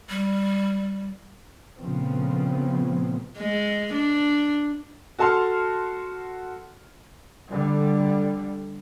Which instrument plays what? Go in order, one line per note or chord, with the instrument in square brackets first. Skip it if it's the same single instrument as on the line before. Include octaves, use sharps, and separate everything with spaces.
[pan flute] G3
[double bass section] A#2 C#3 F3 A3 B3 C4
[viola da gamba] G#3
D4
[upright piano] F#4 A4 A5 C6 F6
[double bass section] D3 G3